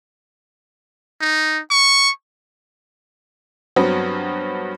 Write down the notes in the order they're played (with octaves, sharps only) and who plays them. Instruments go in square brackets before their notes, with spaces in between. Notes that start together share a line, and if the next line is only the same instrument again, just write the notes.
[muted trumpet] D#4
C#6
[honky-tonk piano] G2 F#3 B3 C4